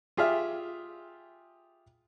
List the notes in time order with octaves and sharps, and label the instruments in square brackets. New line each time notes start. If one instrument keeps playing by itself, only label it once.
[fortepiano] F4 G4 G#4 E5 F6